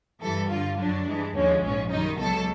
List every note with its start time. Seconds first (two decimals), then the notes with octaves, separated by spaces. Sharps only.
0.22 G2 E3 G3 A4
0.50 G2 D3 G3 F4
0.78 F#2 D3 F#3 D4
1.07 G2 E3 G#3
1.35 D#2 D3 F3 G#3 C#4
1.63 A#1 G#2 F3 C#4
1.91 F#2 D#3 G3 D#4
2.19 C#2 B2 F#3 A4